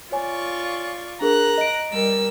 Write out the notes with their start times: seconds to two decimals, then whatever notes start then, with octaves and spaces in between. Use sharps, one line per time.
0.12 F4 C#5 D5 G#5 C#6
1.21 D4 G#4 A#4 A#5 F#6
1.58 D#5 D7
1.90 G3 A#4 E6